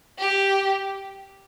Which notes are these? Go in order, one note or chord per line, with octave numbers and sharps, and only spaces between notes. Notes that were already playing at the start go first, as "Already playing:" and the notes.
G4